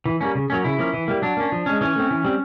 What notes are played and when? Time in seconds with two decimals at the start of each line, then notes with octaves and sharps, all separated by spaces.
0.06 E3
0.21 G3 A#3 C#4
0.35 C#3
0.50 F#3 A#3 C#4
0.64 C#3 E4
0.78 F3 A#3 C#4
0.94 E3
1.08 G3 A#3
1.22 F#3 D4
1.37 A#3 C#4
1.52 F3
1.66 G#3 C#4
1.81 E3 C#4
1.96 A3 C4
2.11 E3
2.24 G3 C4